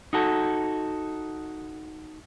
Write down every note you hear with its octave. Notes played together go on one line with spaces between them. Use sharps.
D#4 F#4 A4